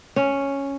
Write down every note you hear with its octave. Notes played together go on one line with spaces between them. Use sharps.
C#4